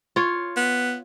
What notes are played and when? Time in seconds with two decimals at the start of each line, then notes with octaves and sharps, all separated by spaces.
0.16 F4 C#5
0.57 B3